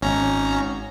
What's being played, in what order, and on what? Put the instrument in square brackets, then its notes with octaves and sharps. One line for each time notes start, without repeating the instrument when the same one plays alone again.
[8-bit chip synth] G#1 C#4 A#5